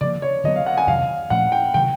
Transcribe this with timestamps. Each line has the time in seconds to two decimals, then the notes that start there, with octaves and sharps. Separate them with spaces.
0.01 C#3 F3 A#3 D5
0.22 C#5
0.44 D3 F#3 B3 D#5
0.56 F5
0.66 F#5
0.78 G#5
0.87 F2 C3 D#3 F#3 F5
1.30 A#2 F3 A3 C#4 F#5
1.52 G5
1.74 C3 D#3 F#3 G5